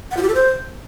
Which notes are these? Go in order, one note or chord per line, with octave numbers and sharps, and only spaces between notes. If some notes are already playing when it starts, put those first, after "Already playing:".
F#5
F4
G4
A4
C5